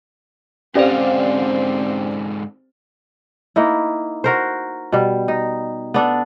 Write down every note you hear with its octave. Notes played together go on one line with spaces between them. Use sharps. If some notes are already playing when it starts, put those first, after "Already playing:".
G#2 D3 C4 C#4 G4 C5 D5 F5
A#3 D#4 E4
F#4 A#4 C5
B2 G3
D#4
B3 D4 A4